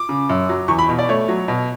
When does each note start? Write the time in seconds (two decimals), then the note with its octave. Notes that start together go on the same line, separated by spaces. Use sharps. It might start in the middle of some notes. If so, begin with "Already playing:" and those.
Already playing: D6
0.09 C#3
0.29 F#2
0.49 F#3
0.68 E2 C#6
0.79 B5
0.89 B2
0.98 D5
1.09 A3 C#5
1.28 F#3
1.48 B2